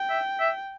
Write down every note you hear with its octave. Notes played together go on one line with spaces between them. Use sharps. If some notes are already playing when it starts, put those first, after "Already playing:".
Already playing: G5
E5
E5